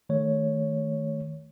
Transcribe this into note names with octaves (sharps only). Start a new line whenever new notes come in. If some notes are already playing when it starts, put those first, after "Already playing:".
D#3 A3 C#5